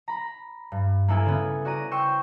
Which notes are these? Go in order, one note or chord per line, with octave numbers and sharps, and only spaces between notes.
A#5 B5
G2
A#3 B3 E4 A4 E5 G#5
C#3 B3
F#4 D5 A#5 D#7
C5 G5 C#6 E6 G6